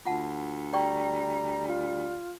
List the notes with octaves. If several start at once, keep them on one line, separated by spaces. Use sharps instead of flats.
D2 F4 F#5 A5
G3 D5 G5 A#5 C#6
F4